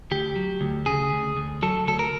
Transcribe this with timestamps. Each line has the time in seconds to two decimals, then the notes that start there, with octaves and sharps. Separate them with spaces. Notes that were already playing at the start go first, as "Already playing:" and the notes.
0.11 D2 G4
0.36 F#3
0.61 D2
0.86 C#3 G#4
1.12 D2
1.37 D2
1.62 F#3 A4
1.87 D2 A4
1.99 A#4